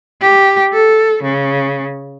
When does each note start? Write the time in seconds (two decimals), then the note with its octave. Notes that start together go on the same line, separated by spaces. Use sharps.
0.22 G4
0.73 A4
1.23 C#3